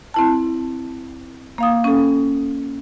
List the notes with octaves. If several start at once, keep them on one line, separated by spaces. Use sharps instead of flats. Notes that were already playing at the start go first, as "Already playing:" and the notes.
C4 E4 A5
A#3 F5 D#6
C#4 A4